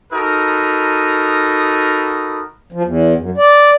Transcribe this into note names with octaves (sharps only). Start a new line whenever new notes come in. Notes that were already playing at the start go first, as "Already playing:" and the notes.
D#4 F#4 A4 A#4 B5 D#6
F3
E2
F#2
D5